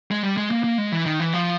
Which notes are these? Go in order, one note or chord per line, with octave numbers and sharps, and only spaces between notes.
G#3
G3
G#3
A#3
A#3
G#3
E3
D#3
E3
F3